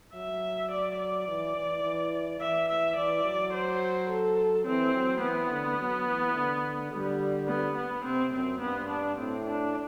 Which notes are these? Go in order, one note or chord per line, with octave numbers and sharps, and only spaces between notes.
F#3 E5
D5
D5
E3
E3
E3
E3 E5
E5
E3 D5
F#3
C5
A4
E3 C4
F#3
E3 B3
D3
F#3
E3
D3
D3 G3
B3
B3
C3 C4
F#2 C4
G2 B3
D4
A2 C4
D4